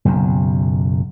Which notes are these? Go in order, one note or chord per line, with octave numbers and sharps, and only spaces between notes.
F#1 B1 F#2